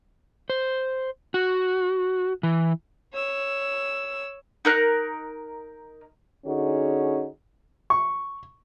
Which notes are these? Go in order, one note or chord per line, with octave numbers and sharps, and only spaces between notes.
C5
F#4
E3
C#5 E6
D#4 A#4 F#6
D3 C#4 D#4 F#4 G#4
C#6